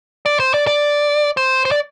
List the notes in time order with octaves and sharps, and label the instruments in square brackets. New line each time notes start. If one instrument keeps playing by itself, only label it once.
[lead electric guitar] D5
C5
D5
D5
C5
C5
D5